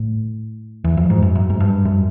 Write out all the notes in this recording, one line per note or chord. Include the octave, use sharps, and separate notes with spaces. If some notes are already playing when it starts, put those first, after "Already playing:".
Already playing: A2
E2
F2
G#2
F#2
F#2
G#2
G2
F#2